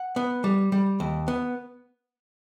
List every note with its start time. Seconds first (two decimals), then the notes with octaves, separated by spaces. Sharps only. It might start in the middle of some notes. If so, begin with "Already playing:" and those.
Already playing: F#5
0.16 B3
0.44 G3
0.72 G3
1.00 D#2
1.28 B3